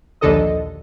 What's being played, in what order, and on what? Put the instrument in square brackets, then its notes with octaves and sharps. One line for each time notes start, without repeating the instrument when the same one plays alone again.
[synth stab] A#1 D#2 D3 A4 D#5